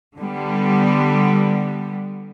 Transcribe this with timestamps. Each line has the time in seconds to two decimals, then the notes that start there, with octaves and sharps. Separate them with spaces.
0.16 D3 G3 B3